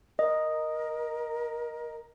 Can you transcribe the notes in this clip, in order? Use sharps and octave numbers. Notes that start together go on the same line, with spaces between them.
A#4 D#5